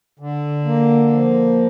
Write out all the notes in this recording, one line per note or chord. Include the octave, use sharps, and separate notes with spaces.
D3
A#3
F3